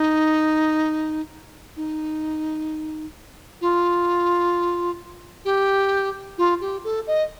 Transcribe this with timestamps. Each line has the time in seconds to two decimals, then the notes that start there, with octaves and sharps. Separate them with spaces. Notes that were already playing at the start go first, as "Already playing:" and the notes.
Already playing: D#4
1.76 D#4
3.61 F4
5.45 G4
6.38 F4
6.61 G4
6.84 A4
7.07 D#5